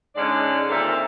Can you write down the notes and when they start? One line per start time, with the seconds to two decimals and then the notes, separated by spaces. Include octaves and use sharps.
0.16 G#2 D3 G#3 C#4 D5
0.69 A#2 D#3 A#3 C4 A4 E5